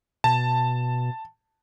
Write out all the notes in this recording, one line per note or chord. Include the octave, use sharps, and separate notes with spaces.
B2 A5